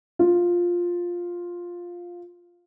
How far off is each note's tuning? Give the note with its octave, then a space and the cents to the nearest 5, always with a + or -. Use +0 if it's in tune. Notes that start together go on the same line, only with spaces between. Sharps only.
F4 +5